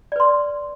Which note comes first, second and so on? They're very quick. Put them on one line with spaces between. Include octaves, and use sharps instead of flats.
D5 B4 C6